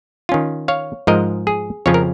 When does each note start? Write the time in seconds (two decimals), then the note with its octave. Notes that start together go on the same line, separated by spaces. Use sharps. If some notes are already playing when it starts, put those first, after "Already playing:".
0.29 D#3 C#4 F4
0.68 C#5 F5
1.07 G#2 F3 G#3 A#4 D#5
1.47 G#4
1.86 F2 C#3 F3 C#4 F4 C#5
1.94 A#4